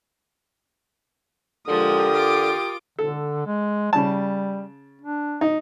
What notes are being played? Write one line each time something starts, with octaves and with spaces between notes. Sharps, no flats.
D3 F3 G#3 G4 A#4 D#6
F4 D6
D3 A4
G#3
C#3 G3 A5
D4
D#4